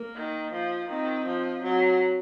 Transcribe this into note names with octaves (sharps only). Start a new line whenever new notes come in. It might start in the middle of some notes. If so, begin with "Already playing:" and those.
Already playing: A#3
D#3
F3
D#3 C4
F3
F#3 C4